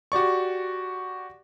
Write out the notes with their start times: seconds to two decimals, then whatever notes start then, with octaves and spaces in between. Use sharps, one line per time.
0.12 F#4 G4 D5 C#6